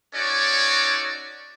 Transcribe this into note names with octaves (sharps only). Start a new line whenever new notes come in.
C#4 D#4 F#4 A4 C#5 D5